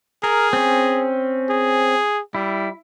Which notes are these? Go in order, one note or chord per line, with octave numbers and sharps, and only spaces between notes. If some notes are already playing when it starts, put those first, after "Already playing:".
G#4 A#4
C4 C#4
G#4
G3 E4